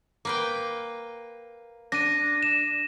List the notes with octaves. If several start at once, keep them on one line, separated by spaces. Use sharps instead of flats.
A#3 B4 G5
D4 A#6 D#7
E7